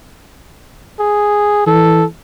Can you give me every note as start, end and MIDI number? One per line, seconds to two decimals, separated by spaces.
1.00 1.65 68
1.67 2.04 52
1.67 2.05 69